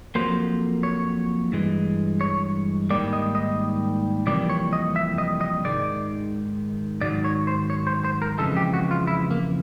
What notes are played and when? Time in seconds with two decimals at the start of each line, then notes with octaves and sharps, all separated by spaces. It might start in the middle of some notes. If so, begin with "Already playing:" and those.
0.15 F2 C#3 F#3 A#3 C5
0.83 C#5
1.52 G2 E3 G#3
2.21 C#5
2.90 G#2 D#3 G3 A#3 D5
3.13 D#5
3.35 D#5
4.27 F2 C3 E3 G3 A#3 D5
4.50 C#5
4.73 D#5
4.96 E5
5.18 D#5
5.41 D#5
5.65 G#2 D#3 G#3 D5
7.01 G#2 D#3 F#3 D5
7.25 C#5
7.47 C5
7.70 C#5
7.87 C5
8.04 C5
8.22 A#4
8.38 F2 C#3 E3 G#3 A4
8.57 G4
8.74 F#4
8.91 F4
9.07 E4
9.31 A#3